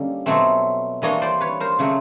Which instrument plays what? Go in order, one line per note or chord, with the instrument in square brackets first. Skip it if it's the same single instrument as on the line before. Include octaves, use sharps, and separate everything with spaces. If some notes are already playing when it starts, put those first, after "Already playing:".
Already playing: [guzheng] D3 G3 A#3 C#4 D#5
B2 F#3 A3 C4
E3 G3 A#3 D4 C#5 D#5
C5 D5
B4 C#5
A#4 C5
C#3 F#3 A3 C4